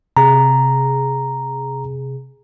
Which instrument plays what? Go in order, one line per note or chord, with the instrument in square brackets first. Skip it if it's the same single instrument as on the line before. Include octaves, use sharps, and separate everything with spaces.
[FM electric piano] C3 G#4 [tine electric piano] A#5